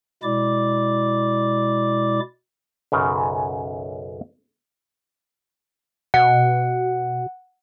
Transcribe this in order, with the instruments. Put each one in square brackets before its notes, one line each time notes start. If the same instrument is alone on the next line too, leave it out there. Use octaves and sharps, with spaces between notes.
[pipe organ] B2 G#3 E4 D5 D6
[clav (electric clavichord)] B1 F#2 C#3
[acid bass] B2 [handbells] F#5